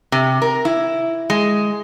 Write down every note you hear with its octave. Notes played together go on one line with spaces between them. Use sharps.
C3
A#4
E4
G#3